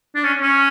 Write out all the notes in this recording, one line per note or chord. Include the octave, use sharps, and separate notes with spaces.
D4
C#4
C#4